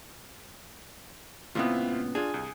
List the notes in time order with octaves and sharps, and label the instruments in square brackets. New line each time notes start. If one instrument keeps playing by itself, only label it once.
[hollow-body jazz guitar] C#2 A#2 B3 [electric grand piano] C4 E4 F4
[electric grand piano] D4 F4 [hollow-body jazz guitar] G#4
[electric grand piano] C2